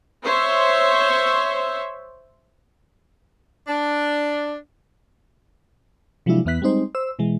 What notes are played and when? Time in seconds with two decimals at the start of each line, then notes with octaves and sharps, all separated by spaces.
0.24 C5 C#5 E5
3.68 D4
6.26 C3 F3 F#3 G#3 D4 E4
6.45 E2 E3 B3 E5 F#6 B6
6.62 G3 G#3 C4 D#4 C5
6.95 C5 E6
7.19 B2 E3 G#3